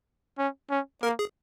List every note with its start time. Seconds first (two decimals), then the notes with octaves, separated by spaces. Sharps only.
0.38 C#4
0.70 C#4
1.02 A#3 A#4
1.19 G#4